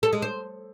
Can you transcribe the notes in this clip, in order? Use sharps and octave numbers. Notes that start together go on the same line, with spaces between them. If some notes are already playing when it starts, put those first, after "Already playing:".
A4
G#3
C5